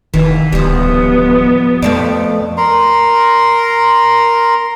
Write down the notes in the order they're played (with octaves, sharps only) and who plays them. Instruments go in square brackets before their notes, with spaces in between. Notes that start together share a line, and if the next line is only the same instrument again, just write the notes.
[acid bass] F1 [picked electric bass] D#3 [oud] E3
[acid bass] D1 [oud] F3 G3 [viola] B3
[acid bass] F2 [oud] F3 A3 D5
[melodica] A#4 A#5 C6